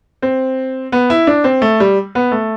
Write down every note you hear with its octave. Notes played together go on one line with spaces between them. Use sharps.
C4
B3
E4
D4
C4
A3
G3
B3
A3